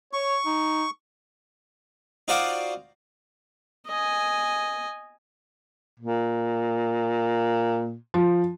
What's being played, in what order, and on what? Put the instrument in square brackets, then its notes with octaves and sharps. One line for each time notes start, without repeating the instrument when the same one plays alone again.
[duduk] C#5 [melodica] C#6
[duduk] D#4
[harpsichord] D#4 F4 F#4 C5 D5 F5
[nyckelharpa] D#5 G#5
[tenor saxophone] A#2
[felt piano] F3